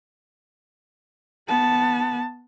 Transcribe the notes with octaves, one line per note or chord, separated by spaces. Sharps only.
B3 A5